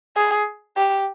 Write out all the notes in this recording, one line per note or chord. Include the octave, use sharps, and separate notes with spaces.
G#4
G4